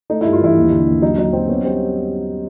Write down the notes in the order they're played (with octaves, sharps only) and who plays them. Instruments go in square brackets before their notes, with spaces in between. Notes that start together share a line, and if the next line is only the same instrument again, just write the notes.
[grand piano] A3 [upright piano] D#4
[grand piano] G2 [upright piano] E4
[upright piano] F4
[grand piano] E3 [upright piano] E4
[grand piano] D#2
D3
D#2
[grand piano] F#3 [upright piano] D#4
[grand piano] F#3 [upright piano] D#4
[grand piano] F#3 [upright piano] C4
[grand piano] B3 [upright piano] C#4
[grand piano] G3 [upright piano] C4